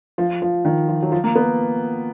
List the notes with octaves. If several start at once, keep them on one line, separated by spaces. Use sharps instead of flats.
F3
F3
D#3
F3
F#3
F3
A#3
B3